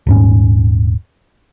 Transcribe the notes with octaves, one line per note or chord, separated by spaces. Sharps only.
D#1 G#2 C#4